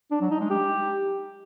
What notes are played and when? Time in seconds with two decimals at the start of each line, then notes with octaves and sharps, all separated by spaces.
0.11 D4
0.21 F#3
0.31 D#4
0.40 G#3
0.50 G4